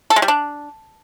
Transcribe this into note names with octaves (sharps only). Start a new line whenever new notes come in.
A4
G#3
G3
D4